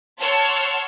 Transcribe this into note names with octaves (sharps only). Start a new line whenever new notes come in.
C#5 F#5 A5 C6 E6 F6